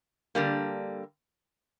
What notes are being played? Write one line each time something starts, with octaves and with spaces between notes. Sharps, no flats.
D3 G3 A#3